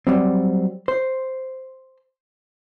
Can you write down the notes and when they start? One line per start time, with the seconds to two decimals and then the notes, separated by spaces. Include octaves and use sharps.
0.07 F#3 G3 C4
0.88 C5